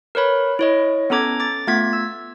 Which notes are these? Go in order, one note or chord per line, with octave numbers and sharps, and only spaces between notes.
A#4 B4 C#5 B5
E4 C#5 D#5
B3 C#4 A4 A#5 D6 G#6
D6 A6
A3 B3 F4 G#6 B6
E6